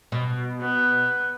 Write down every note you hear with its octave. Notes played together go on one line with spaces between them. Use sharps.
B2
B3